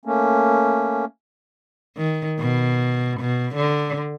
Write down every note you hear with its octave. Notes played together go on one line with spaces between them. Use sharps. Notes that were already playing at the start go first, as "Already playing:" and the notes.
A3 A#3 C#4
D#3
B2
B2
D3